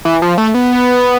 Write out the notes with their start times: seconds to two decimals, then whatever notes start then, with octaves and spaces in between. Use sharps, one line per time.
0.05 E3
0.22 F3
0.38 A3
0.55 B3